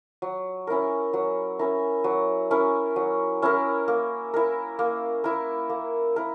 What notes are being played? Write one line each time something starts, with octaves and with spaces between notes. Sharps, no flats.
F#3
C#4 E4 A#4
F#3
C#4 E4 A#4
F#3
C#4 E4 A#4
F#3
C#4 E4 A#4
A#3
E4 A#4
A#3
E4 A#4
A#3
E4 A#4